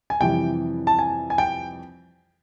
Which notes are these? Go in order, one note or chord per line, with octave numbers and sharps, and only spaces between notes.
G#5
F2 C3 E3 G3 G5
A5
G#5
G#5
G5